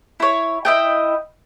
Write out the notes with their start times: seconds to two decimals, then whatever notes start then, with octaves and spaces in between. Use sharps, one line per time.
0.20 E4 C#5
0.65 E4 D#5 G5